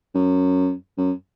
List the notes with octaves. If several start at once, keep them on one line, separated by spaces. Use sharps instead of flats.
F#2
F#2